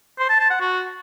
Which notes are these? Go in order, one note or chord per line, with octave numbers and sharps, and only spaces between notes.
C5
A5
A5
F#5
F#4